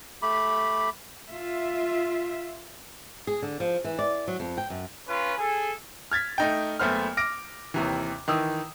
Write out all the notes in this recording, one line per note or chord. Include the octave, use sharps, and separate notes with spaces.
A3 G4 B5
F4 E5
G#4
D3
F3
E3
D5
F#3
F2
G5
F#2
C#4 F4 B4
G#4 A4 G#5
F6 G#6 A6 B6
A3 D#4 G5
F#1 A3 B3 C5 F6
D6 F6 A#6 D7
D#2 C3 E3
D#3 E3 D#6 E6